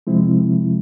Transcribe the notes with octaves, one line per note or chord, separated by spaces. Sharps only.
C3 F3 G#3 C4 E4